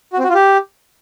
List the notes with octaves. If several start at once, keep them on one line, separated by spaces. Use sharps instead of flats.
F#4
C4
F#4
F4
G4